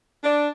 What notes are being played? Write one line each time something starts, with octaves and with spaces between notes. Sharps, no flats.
D4